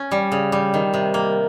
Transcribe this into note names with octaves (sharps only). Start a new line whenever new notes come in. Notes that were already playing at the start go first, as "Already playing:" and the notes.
Already playing: C#4
G3
C#3
G3
D#3
C3
A#3